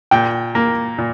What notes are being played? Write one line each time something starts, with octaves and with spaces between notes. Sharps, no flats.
A#2 G5
A#3
A#2